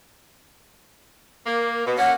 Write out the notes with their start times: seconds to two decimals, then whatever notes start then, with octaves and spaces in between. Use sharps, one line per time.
1.46 A#3
1.87 B2
1.98 A#3 C#4 F#5